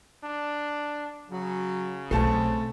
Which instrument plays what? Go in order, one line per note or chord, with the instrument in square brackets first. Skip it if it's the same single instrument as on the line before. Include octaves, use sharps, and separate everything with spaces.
[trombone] D4
[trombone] C#3 [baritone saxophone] F#3
[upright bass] B1 [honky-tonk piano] A3 A5 [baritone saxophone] C4